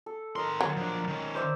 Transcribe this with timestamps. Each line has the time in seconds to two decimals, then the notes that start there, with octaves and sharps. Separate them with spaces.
0.06 A4
0.36 D#3 A#4 D#5 C6 D#6
0.61 F#3
0.77 F3 D4
1.08 D#3 C#4
1.35 C5 D5 E5